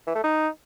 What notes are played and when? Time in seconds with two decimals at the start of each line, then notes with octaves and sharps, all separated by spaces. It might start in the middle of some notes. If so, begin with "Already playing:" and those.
0.07 E3
0.15 A3
0.24 D#4